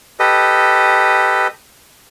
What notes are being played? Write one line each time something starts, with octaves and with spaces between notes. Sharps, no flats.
G4 A4 B4 D#5